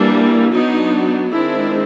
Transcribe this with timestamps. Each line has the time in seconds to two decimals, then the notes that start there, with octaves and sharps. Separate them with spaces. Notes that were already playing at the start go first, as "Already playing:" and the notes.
Already playing: E3 G3 A#3 D4
0.52 F#3 B3 D4 D#4
1.32 D#3 G#3 C4 D4 E4